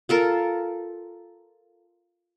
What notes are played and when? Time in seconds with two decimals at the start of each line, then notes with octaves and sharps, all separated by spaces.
0.09 F4 A4 A#4